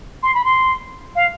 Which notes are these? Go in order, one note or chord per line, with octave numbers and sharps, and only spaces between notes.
C6
B5
C6
F5